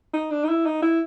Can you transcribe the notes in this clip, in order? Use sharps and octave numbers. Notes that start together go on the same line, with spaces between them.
D#4
D4
D#4
E4
D#4
E4